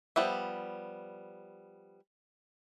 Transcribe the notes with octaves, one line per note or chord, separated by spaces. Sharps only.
F3 G3 B3 E5